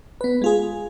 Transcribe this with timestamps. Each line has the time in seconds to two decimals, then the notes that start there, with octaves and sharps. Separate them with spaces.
0.21 B3 B4
0.42 G#3 F4 G#4